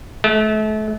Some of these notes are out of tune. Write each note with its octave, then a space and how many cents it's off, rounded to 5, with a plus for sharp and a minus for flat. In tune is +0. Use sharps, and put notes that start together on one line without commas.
A3 -35